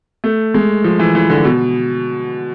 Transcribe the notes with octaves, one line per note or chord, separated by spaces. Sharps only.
A3
G#3
F3
E3
E3
D3
B2